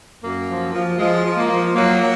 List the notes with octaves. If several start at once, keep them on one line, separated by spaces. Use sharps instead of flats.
F#2 A#3
F3
F3
F3 G#3
F3
A#3
F3
F#3 A#3
F#3